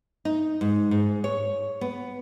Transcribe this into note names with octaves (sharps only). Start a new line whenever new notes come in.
D#4
G#2
G#2
C#5
B3